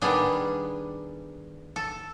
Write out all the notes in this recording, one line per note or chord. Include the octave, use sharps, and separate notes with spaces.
D#3 G3 B3 D4 G#4
A4